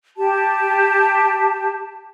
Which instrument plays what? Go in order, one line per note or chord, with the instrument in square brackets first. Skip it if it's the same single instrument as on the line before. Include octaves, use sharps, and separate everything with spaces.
[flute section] G4 A5